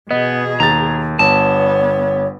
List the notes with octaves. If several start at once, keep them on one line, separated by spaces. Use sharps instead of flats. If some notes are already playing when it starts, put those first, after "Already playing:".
B2 B3 G#4 D#5
D#2 A#5 A6
G1 B3 C#5 A5